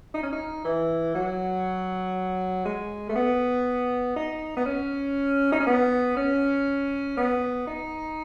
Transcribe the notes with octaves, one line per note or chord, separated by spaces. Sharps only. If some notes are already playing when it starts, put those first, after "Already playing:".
D#4
C#4
D#4
E3
F#3
G#3
A3
B3
D#4
B3
C#4
D#4
C#4
B3
C#4
B3
D#4